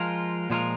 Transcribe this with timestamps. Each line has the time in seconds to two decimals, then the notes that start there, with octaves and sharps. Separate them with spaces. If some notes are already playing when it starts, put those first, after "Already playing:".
Already playing: F3 G#3 F4 A#4
0.50 A#2 F3 G#3 F4 A#4